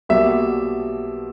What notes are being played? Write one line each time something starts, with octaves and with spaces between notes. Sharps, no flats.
B1 B2 G3 A#3 E5